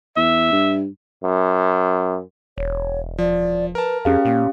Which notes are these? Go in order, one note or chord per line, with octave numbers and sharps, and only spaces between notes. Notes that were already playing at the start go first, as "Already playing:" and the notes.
E2 E5
G2
F#2
E1 C#5
F3 D5
A#4 B4 A5
F2 C#4 G4 G#4 F5
A#2 A#3